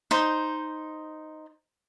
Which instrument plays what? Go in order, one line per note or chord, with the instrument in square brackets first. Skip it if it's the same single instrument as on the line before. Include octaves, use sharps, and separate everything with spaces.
[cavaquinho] D#4 C5